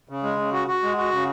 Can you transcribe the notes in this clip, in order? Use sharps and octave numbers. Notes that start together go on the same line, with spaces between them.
C#3
G#3
C#3
F#4
F#4
G#3
F#4
C#3